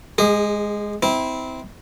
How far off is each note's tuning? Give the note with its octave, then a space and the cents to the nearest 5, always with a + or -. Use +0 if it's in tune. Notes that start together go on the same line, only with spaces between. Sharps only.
G#3 +0 G#4 -40
C4 -15 E4 -25